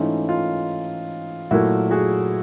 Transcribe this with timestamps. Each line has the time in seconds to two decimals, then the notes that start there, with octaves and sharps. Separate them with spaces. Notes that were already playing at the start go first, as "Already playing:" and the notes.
Already playing: G#2 E3 A3 C#4 D#4 F4
0.28 D#4 F4
1.51 A#2 F#3 A3 E4 F#4
1.91 F#4 G#4